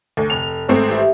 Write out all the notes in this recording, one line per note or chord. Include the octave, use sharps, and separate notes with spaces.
D2
F1 F7
G#1 A3 C4
E3 G4 E5